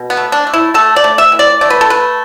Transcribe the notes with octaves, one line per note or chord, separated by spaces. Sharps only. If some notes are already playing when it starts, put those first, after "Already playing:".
Already playing: B2
B3
A3
D4
A3
E4
A3 A4
D5
A3
E5
E3
D5
A3 D5
B4
A4
A3 B4